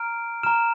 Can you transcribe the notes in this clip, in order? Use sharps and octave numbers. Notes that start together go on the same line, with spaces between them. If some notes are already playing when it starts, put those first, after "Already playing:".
Already playing: A#5 F6 D7
A#5 F6 E7